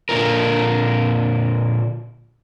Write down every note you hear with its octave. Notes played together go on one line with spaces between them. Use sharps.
A#2 D3 B3 F4 A#4